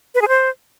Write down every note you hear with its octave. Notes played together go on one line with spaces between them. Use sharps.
B4
G#4
C5